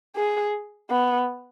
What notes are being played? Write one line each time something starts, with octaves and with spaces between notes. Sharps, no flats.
G#4
B3